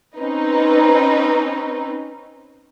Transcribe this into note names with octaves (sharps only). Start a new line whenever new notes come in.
C4 C#4 D#4 B4